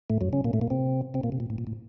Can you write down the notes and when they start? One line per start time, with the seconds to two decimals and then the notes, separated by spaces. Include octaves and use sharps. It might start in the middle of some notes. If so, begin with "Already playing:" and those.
0.10 A2 A3
0.21 F#2 F#3
0.33 C#3 C#4
0.44 A#2 A#3
0.53 A2 A3
0.61 A#2 A#3
0.70 C3 C4
1.14 C3 C4
1.23 A#2 A#3
1.32 C3
1.40 A#2
1.50 A2
1.58 A#2
1.67 A2